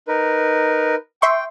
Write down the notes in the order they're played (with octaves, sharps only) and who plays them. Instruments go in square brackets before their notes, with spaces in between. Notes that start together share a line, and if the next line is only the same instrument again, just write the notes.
[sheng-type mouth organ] D#4 A#4 B4
[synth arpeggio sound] E5 C6 C#6 [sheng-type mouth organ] G5